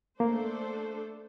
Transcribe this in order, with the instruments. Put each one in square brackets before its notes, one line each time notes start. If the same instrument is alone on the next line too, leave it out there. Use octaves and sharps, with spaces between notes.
[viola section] A3 D4 A4 C5 [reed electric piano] A#3